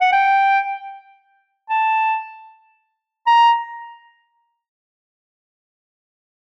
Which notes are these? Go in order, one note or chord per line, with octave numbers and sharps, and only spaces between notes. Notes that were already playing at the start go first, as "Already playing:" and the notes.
F#5
G5
A5
A#5